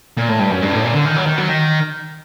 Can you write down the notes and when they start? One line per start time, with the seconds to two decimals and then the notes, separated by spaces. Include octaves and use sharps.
0.17 A#2
0.28 A2
0.39 G2
0.51 F#2
0.62 G2
0.73 A2
0.83 A#2
0.94 D3
1.05 D#3
1.16 F#3
1.26 D#3
1.38 F#3
1.49 D#3